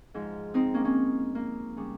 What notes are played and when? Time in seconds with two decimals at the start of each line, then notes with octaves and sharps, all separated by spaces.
0.14 G#2 F3
0.54 C4 D#4
0.74 A#3 C#4
0.85 A#3 C#4
1.35 A#3
1.77 C#3 G3